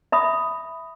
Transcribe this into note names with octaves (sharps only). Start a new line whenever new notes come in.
E5 B5 D#6